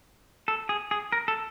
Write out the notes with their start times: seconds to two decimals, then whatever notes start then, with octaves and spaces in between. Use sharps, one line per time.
0.48 A4
0.69 G#4
0.91 G#4
1.12 A#4
1.28 A4